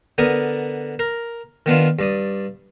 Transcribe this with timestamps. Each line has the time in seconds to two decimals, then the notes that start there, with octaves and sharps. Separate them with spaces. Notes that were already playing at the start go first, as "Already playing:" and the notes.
0.18 D3 B3 A#4 D5 D#6
0.99 A#4
1.66 D#3 B3 D4 F4
1.99 G2 D5 D#6